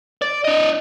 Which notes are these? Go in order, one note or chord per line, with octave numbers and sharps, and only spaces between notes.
D5
D4 D#5